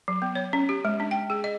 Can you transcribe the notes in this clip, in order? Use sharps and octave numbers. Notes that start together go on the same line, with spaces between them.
F#3
B3
C#5
C#4
G4
G#3
D4
G5
G#4
D#5